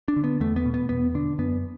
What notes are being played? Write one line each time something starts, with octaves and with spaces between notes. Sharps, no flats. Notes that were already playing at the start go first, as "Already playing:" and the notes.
D4
D3
B3
E2 A3
B3
B2
B3
E2 B3
D3 D4
F#2 B3